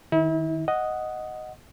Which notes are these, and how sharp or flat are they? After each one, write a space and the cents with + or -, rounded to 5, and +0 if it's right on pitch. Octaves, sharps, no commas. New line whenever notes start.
D#3 +0 E4 -35
D#5 +0 F#5 +0